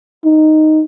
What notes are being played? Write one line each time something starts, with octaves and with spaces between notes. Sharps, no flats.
D#4